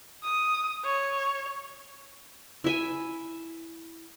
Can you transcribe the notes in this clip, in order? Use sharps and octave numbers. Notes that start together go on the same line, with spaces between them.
D#6
C#5
E4 E5 G#5